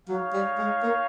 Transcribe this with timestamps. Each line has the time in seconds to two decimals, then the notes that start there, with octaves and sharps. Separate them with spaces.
0.08 F#3 D#4 G#4 C#5 F5
0.33 G3
0.58 G#3
0.83 A#3